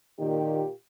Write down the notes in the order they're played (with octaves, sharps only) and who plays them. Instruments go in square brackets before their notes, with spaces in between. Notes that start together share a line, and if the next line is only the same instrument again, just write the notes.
[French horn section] A#2 G4 [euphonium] D#3